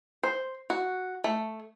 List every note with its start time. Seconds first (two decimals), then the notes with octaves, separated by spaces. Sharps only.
0.23 C5
0.70 F#4
1.24 A3